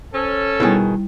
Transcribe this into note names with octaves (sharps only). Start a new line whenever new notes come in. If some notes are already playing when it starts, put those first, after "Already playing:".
C#4 A4 C5
B2 D#3 G3 E4 G#4